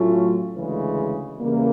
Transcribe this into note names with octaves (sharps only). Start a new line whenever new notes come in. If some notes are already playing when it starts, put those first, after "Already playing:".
Already playing: A2 F#3 A3 C#4 F4
D2 C#3 E3 G#3
E2 C#3 E3 G3 A#3